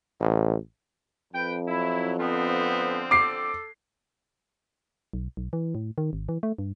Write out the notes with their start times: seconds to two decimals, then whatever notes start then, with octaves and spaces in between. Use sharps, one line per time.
0.20 A1
1.33 F2 B4 G5
1.68 F#3 E4
2.19 D3 F3 B3 C4
3.11 A4 D6 C7
5.13 B1
5.37 B1
5.53 E3
5.75 A2
5.98 D#3
6.13 G#1
6.29 E3
6.43 A3
6.58 G2